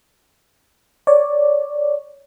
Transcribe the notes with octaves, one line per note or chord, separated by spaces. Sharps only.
C#5 D5